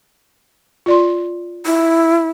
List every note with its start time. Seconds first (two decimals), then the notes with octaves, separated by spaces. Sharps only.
0.86 F4 D5 C6
1.66 E4